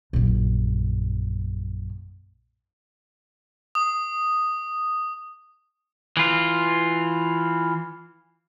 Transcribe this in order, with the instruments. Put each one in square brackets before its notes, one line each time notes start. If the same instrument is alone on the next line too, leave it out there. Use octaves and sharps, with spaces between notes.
[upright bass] A#1 F#2
[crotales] D#6
[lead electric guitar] E3 F4